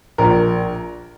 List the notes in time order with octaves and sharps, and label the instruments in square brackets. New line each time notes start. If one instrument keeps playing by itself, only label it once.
[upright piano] A#1 A#4